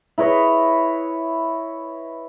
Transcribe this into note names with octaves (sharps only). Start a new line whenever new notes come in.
E4 B4 C#5 D#5